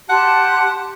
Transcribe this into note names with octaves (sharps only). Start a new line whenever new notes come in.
G4 F#5 A5 C6